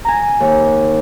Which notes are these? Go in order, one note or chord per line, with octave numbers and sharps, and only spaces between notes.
G#5 A#5
D#2